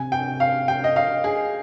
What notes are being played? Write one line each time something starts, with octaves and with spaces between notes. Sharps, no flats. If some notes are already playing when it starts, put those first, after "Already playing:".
Already playing: C3 G#5
G5
F5
G5
D#5
F5
G#4